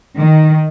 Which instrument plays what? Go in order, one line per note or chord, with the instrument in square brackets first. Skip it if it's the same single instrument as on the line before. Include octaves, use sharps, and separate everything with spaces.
[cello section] D#3